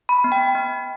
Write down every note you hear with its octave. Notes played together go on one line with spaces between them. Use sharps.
B5
B3
G5
B3